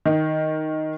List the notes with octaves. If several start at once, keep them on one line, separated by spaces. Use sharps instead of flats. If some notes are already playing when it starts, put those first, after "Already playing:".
D#3